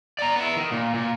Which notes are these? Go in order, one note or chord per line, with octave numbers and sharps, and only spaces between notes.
D5 A#5
B3 E4
D#3
A#2
A#2